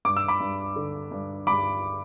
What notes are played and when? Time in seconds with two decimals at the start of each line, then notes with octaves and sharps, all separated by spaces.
0.05 G2 D6
0.16 E6
0.28 B5 D6
0.40 G2
0.76 D3
1.11 G2
1.47 G2 B5 D6